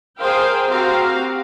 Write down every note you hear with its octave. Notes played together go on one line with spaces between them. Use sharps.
G#4 A#4 C5 F5 G5
C4 F#4 G4 F5 A#5